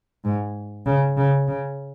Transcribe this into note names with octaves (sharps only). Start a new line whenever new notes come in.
G#2
C#3
C#3
C#3